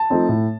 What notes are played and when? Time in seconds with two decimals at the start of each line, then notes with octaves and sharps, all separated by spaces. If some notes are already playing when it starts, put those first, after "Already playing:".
Already playing: A5
0.10 F3 A3 C4 D#4
0.29 A2